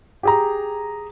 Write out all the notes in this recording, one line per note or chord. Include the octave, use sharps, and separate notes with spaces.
G4 G#4 A#5